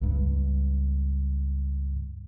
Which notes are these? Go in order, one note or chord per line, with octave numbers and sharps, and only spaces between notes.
C#2 G2